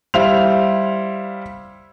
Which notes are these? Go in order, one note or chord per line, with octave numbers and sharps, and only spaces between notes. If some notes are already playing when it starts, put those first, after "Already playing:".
G3 E4 C5 F5 F7